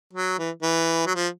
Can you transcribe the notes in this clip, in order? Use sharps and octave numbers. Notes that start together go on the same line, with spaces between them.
F#3
E3
E3
F#3
F3